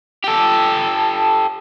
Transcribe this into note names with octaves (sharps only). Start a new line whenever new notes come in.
G4 A4